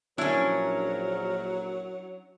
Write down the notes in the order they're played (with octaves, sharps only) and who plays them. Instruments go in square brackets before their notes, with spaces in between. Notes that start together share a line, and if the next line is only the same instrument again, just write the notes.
[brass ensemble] A#1 A#4 [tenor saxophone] F#3 [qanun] C#4 D4 [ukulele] E4